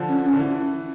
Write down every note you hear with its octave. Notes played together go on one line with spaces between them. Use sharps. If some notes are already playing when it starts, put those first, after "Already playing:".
Already playing: D3 F3
C#4
C#4
D3
E3